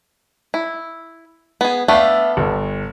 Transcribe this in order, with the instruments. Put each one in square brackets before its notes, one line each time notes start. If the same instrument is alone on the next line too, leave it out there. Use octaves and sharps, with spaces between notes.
[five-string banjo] E4
B3 G#4
[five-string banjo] A3 B3 D4 [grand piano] E5 F5
[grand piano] G1